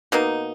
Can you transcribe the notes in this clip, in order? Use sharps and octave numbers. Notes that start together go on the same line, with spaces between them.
B2 A#3 D#4